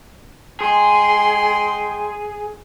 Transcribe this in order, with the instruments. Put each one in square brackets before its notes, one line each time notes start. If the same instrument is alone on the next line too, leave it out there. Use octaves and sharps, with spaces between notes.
[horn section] G#3 G5 C6 [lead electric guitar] G#4